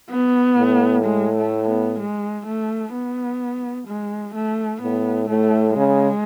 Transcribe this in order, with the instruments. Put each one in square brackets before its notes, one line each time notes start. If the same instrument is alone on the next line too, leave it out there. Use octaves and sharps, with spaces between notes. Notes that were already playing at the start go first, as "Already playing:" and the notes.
[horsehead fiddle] B3
[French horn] A2
[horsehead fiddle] G#3
A3
B3
G#3
A3
B3
G#3
A3
[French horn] A2 [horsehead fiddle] B3
[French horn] A2 [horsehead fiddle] A3
[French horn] C#3 [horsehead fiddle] G#3